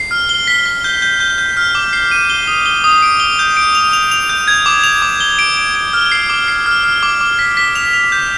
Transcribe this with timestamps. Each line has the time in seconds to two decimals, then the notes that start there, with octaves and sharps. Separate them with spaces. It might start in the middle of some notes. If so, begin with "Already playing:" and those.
Already playing: C7
0.11 F6
0.29 G7
0.47 B6
0.66 B6
0.84 G6
1.02 G6
1.20 G6
1.38 G6
1.57 F6
1.75 D6
1.93 C7
2.11 D#7
2.30 G7
2.47 D#6
2.66 G7
2.84 D#6
3.02 D7
3.20 G7
3.39 G6
3.57 D7
3.75 F7
3.93 F7
4.11 F7
4.29 G6
4.48 G#6
4.66 D6
4.84 F7
5.02 D6
5.20 G7
5.39 D7
5.57 D7
5.75 D7
5.93 F6
6.12 C7
6.29 D6
6.48 C7
6.66 F6
6.84 F6
7.03 D6
7.21 D6
7.39 B6
7.57 B6
7.75 F7
7.93 F7
8.12 G6